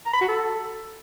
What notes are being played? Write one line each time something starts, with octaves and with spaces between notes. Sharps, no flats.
A#5
B5
F#4
A4